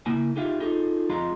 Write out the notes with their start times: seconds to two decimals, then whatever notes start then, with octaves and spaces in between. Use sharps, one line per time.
0.06 C#3 A#3 E4 G#5
0.36 D#4 F4 G4 G#4 E5 F5
0.60 D#4 F4 G#4 A4
1.09 F2 G#3 F4 F5 A#5 C6